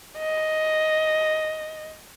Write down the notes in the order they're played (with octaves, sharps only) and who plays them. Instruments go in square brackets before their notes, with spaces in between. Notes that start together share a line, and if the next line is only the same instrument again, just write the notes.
[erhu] D#5